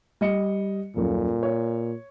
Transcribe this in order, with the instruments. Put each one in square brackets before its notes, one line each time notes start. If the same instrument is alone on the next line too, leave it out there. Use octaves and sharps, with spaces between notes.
[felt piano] G3 D#5 C#7
[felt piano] D#1 F#2 [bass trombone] A#2
[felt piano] C#5